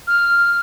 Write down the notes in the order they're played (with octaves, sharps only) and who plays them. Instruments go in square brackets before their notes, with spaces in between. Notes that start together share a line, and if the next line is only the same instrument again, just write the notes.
[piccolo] F6